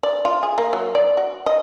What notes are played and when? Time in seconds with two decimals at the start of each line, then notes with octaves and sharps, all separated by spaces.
0.03 D5
0.25 F4
0.43 G#4
0.58 A#3
0.73 F#3
0.95 D5
1.17 F#4
1.46 D#5